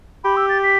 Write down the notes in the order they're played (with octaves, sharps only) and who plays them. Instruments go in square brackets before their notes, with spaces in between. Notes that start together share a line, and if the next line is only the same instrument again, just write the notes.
[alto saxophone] G4 [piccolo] B5
[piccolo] E6
A6
B6